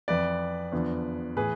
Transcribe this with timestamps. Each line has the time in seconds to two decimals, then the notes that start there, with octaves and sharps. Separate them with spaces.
0.08 F2 E3 B4 D5
0.72 E2 D3 F3
1.36 A2 E3 G#4 B4